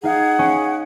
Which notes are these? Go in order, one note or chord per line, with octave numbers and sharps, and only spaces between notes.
D#4 G#4 F5 F#5
C#4